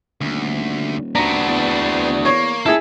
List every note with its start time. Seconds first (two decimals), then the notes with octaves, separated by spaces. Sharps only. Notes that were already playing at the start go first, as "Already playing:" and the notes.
0.21 D#1 D2
1.15 B3 C4 D4 F#4 A#5
1.48 E2
2.25 A#3 C#5
2.66 C#2 E4 G#4 A4